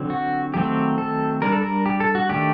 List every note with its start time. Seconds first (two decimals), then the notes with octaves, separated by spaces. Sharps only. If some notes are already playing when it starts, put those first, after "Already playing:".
Already playing: D3 F#3 C4
0.10 F#4
0.54 D#3 F#3 A3 C4 G4
0.98 A4
1.42 G3 D4 A#4
1.52 A4
1.62 A#4
1.86 G4
2.00 A4
2.15 F#4
2.29 D#3 A3 D4 G4